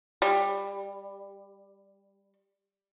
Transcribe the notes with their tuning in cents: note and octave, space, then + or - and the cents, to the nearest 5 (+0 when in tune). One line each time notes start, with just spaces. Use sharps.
G3 +15